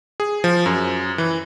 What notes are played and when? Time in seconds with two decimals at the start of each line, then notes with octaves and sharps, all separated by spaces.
0.20 G#4
0.44 F3
0.66 F#2
1.18 E3